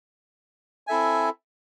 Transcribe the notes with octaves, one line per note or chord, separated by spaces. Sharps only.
C4 E4 A4 E5 G#5